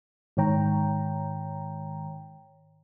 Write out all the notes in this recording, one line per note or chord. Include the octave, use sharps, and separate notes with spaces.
G#2 D#3 C#5 G5 A#5